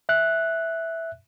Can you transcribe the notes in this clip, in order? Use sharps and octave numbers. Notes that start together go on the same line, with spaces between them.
E5 F#6